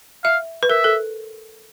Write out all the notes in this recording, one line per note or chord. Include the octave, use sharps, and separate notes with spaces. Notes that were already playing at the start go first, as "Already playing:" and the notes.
E5 F5
B4
A#4 E5
A4